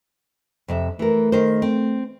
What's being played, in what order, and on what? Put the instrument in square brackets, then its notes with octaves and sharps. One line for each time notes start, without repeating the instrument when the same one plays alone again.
[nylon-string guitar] F2 C3 E5
[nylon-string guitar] E3 A#4 [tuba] A3
[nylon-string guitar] D#3 A#4 C5
C4